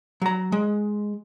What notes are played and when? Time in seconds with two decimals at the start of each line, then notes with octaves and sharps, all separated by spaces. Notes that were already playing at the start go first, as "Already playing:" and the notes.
0.21 F#3 A#5
0.52 G#3